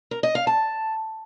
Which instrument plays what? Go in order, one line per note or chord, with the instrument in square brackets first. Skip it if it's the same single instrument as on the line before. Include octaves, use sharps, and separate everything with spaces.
[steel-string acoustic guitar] A#4
D#5
F5
A5